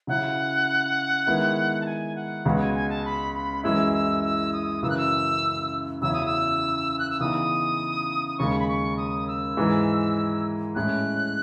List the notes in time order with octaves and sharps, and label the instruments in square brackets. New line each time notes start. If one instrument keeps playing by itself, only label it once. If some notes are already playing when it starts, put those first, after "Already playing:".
[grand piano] C#3 F#3 C#4 E4 [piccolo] F#5
[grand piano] D#3 G#3 B3 E4
[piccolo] A5
G#5
F#5
[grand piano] C#2 C#3 G#3 B3 F#4
[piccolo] F#5
G#5
G#5
A5
B5
B5
[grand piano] F#2 E3 G#3 C#4 E4 [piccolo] E6
[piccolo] E6
E6
D#6
[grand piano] F#2 C#3 E3 [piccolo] E6
[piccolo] F#6
E6
[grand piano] E2 C#3 F#3 C#4 E4 [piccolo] E6
[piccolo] D#6
E6
F#6
E6
[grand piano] C#3 E3 B3 D#4 [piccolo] D#6
[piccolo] D#6
[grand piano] D#2 C#3 G#3 [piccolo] C#6
[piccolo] B5
C#6
D#6
E6
[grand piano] G#2 E3 G#3
[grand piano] A2 G#3 C#4 [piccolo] F#6